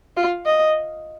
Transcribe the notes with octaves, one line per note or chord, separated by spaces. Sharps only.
F4
D#5